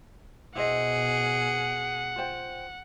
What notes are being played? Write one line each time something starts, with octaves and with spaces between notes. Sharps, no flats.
B2 E4 G#4 C5 D#5 F#5
F4 C5 G5